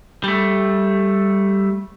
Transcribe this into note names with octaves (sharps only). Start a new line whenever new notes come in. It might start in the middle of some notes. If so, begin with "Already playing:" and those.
G3 A3